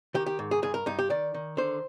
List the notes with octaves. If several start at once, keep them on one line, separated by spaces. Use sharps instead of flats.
D#3 G4
G4
G#2
G#4
G2 G#4
A#4
G2 D#4
G4
D#3 D5
D#3
D3 C5